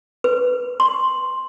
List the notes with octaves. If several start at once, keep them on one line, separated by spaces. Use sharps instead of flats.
B4
C6